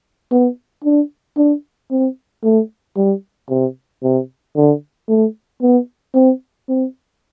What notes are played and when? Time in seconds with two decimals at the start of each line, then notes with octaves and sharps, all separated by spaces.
0.32 B3
0.84 D4
1.37 D4
1.91 C4
2.44 A3
2.97 G3
3.50 C3
4.03 C3
4.56 D3
5.09 A3
5.62 B3
6.14 C4
6.69 C4